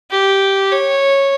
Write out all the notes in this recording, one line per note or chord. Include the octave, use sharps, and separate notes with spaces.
G4
C#5